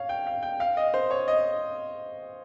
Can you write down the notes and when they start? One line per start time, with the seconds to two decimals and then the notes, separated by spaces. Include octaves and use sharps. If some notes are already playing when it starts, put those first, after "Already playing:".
Already playing: C#5 F5
0.09 G5
0.27 F5
0.43 G5
0.60 F5
0.77 D#5
0.94 C5
1.11 C#5
1.28 D#5